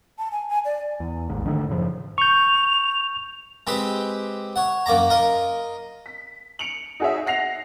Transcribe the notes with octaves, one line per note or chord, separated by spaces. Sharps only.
A5
G#5
G#5
D5
E2
A1 D#2 G#2
D3 D#3 G#3 A3
F#2 A2 C#3 F3
C#6 G6 F7
G#3 C4 G4 B4 C5
C#5 F#5
F#2 A#3 D5 A#5
F4 A#4 D#5
B6
C#7 D7 F7 F#7
D#4 F#4 G#4 C#5 E5
F#5 A#6 C7 F7